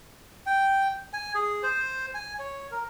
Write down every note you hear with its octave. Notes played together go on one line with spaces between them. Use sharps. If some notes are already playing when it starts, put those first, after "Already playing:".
G5
G#5
G#4
C5
G#5
C#5
A#4